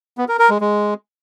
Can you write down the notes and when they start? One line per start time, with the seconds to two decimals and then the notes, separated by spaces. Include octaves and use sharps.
0.18 B3
0.29 A#4
0.39 A#4
0.50 G#3
0.61 G#3